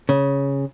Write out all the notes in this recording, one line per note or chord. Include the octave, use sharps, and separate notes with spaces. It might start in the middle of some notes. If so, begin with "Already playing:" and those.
C#3